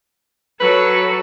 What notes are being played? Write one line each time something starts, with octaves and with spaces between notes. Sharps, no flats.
F#3 A4 B4